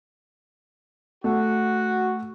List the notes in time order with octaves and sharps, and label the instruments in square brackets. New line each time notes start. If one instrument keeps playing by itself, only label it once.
[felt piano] A3 [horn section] F#4